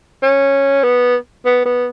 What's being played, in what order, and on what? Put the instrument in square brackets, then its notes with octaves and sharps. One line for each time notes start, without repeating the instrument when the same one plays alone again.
[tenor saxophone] C#4
B3
B3
B3